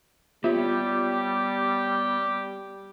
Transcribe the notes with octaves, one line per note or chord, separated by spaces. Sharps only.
G3 B3 F4 G4 C#5 E5